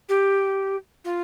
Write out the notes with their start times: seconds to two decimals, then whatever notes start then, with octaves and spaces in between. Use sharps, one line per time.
0.09 G4
1.04 F4